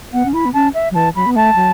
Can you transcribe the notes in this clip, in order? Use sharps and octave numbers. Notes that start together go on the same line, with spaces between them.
B3 F#5
C#4
E4 B5
B3
C#4 A5
E5
F#3
E3 A5
F#3 B5
B3
A3 A5
F#3